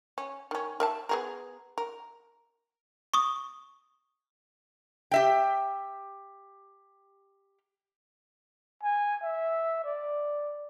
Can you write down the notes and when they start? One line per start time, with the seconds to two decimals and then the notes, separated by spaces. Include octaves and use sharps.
0.18 C#4
0.51 D#3 C#4
0.80 A#4 E5 A5
1.09 B3 G#4 A#4
1.78 A#4
3.14 C#6 D#6
5.11 G4 E5 G5
8.83 G#5
9.23 E5
9.85 D5